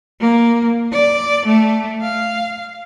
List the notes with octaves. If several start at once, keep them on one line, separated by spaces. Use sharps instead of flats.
A#3
D5
A3
F5